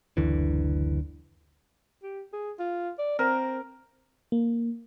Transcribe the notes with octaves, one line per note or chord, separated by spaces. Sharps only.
F#1 D2 D3 E3
G4
G#4
F4
D5
C4 A#4
A#3